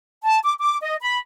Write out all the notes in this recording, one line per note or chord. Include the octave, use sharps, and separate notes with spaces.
A5
D6
D6
D#5
B5